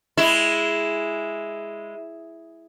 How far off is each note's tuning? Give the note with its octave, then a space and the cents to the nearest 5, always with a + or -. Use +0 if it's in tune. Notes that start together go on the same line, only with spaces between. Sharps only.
G#3 +0 E4 +0